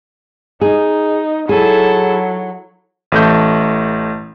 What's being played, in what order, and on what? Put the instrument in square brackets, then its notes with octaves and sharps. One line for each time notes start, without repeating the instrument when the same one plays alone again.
[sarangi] D#4 [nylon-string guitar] G#4
[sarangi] F#3 [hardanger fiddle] E4 A4 [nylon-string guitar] G#4
[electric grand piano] A1 A3 G6